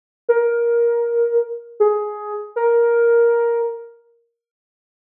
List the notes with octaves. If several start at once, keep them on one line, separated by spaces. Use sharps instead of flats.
A#4
G#4
A#4